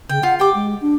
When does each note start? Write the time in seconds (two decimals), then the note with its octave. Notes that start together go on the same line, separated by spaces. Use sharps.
0.09 C#3 G5
0.23 F4 F#5
0.40 G4 G5 D6
0.55 G#3
0.81 D4